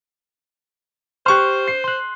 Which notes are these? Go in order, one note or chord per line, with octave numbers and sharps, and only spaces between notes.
G4 C5 C6 C#6 F6 F#6
C7
C6 F#6